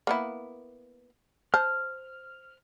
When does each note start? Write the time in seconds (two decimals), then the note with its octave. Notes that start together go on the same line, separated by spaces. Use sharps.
0.07 A#3 B3 E4
1.54 C5 A5 F6